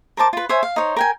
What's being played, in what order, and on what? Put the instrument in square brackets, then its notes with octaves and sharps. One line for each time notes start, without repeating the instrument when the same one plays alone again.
[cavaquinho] A#4 C5 A5 D6
F4 B4
C5 C#5 E5 G#5
F5
D#4 C5 C#5
A#4 G5 G#5